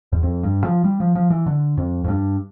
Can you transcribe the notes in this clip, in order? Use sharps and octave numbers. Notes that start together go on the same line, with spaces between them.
E2
F2
G2
F3
G3
F3
F3
E3
D3
F2
F2
G2